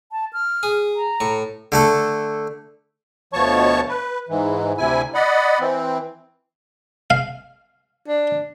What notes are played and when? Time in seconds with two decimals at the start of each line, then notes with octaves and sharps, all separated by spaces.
0.12 A5
0.33 F6
0.63 G#4
0.96 A#5
1.20 A2 C#6
1.72 D3 A3 A4
3.33 D2 B2 F3 C#5 A5 C#6
3.89 B4
4.29 G#2 E3
4.77 D2 C3 E4 G#5
5.14 D5 D#5 F#5 B5
5.60 E3 C4
7.10 F5
8.08 D4